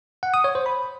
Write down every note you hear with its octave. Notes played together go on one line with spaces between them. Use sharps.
F#5
D#6
C#5
C5
B5